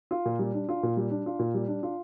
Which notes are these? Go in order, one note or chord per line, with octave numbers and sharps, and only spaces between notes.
F4
A#2
G3
D4
F4
A#2
G3
D4
F4
A#2
G3
D4
F4